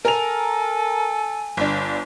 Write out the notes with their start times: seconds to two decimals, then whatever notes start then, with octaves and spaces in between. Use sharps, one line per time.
0.05 A4 A#4 G#5 F7
1.57 G1 D4